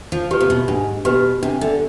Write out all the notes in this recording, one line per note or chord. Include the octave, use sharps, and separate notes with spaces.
F3
F3 G4 B4
C3
B2
G#2 D4
B2 G4 B4
C3 D4
D3